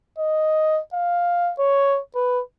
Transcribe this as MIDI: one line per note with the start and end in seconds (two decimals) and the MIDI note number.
0.18 0.80 75
0.94 1.52 77
1.59 2.00 73
2.15 2.42 71